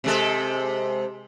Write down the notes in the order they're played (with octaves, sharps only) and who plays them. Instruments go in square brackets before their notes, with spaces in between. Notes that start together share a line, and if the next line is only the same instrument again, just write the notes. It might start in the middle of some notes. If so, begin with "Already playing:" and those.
[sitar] C3 G#3 A4